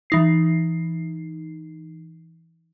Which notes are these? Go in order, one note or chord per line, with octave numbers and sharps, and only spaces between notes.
E3 D#4 C7